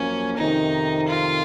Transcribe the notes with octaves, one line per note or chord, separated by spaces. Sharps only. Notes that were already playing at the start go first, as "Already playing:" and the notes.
Already playing: F#2 F3 A#3 C#4
F2 C3 D#3 D#4
F4